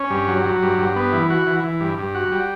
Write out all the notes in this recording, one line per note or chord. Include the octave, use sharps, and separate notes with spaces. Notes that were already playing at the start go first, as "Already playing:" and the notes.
Already playing: C#4
G2
F#3
F#3
G2
G2
B3
E3
F#4
E3
E3
G2
G2
F#4
G3